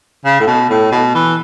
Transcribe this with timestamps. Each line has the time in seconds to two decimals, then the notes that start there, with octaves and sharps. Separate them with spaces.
0.25 C#3
0.40 A2
0.47 B2
0.70 A2
0.92 B2
1.14 E3